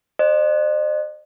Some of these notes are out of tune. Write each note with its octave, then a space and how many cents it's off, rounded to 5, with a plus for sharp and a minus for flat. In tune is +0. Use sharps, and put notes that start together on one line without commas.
C5 +15 D#5 -45